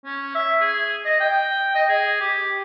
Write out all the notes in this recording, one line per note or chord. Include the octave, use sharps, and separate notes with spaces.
C#4
E5
G#4
D#5
G5
D#5
G#4
G4